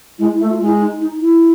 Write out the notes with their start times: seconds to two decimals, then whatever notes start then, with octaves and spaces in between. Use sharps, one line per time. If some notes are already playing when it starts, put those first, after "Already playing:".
0.18 G#3 E4
0.34 E4
0.39 A3
0.48 F4
0.59 G#3 E4
0.80 D#4
1.00 D#4
1.20 E4